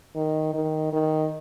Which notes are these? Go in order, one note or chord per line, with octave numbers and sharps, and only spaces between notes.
D#3
D#3
D#3